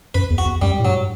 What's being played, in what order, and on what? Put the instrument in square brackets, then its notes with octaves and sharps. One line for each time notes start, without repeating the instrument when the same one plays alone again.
[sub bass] F#2 [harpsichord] B4
[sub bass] E2
[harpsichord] F#4
[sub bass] E2
[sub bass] F#2 [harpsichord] G3
[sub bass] A2
[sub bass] G2 [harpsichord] F#3